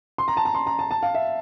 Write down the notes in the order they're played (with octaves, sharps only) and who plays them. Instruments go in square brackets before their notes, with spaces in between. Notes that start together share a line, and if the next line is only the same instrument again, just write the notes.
[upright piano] C6
A#5
A5
A#5
C6
A#5
A5
A5
F5
E5